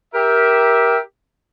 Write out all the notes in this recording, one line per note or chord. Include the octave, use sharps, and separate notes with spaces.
G4 A#4 E5